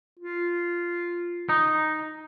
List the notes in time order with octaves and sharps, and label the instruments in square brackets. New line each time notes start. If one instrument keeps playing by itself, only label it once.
[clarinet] F4
[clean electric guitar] D#4